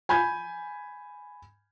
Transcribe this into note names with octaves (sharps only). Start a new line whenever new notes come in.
G#5 B5 G6 G#6